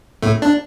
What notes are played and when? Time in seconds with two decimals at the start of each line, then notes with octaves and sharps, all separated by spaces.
0.22 A2 A3
0.42 D4